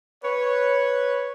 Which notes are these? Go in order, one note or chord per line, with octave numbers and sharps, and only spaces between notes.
B4 C#5